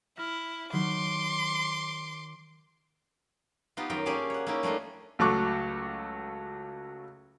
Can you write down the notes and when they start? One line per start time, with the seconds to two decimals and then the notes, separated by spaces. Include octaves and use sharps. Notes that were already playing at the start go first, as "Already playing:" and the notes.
0.17 E4 F6 A#6
0.73 D#3 F#3 C6 D6
3.77 B3 D#4 F4 G4
3.90 F#2 D#3 F4 G5 A#5
4.06 A#3 C#4 G4 G#4 D5 A5
4.30 C#5 F#5
4.47 A#3 C#4 D#4 E4 G4
4.63 G3 A3 D4 D#4 F4
5.19 C#2 F#3 A3 C#6 D6 F#6